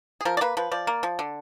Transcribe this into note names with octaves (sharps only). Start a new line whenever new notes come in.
G#4
F3 A#4
D5
A#3 B4
F3 B4
F3 D5
A#3
F3
D3